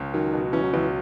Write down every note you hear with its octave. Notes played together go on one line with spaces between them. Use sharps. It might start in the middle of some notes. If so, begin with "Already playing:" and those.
Already playing: C#2 C#4
D#3 F#3
B2
E3 C#4
F#3
C#2 E3